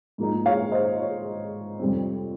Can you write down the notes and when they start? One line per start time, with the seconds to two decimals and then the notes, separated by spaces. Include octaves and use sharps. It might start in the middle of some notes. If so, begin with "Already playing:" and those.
0.18 G#2 F3 A#3 D#4
0.46 C#5 F5
0.72 C5 D#5
1.00 C#5
1.79 F2 C3 G3 C4